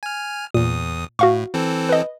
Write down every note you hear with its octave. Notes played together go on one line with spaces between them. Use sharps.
G#5 F6
E2 A#2 D#6
A2 F#4 F5 C#6
E3 C4 A4
B4 D#5